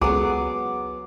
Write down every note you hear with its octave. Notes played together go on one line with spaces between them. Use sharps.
C#2 F#3 B3 G#4 D6